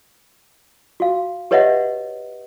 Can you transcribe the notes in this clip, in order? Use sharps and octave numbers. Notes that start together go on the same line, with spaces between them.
F#4 F5
G4 B4 C#5 D#5 E5 F#5